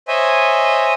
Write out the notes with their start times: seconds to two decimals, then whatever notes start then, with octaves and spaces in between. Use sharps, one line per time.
0.08 C5 C#5 D#5 E5 G#5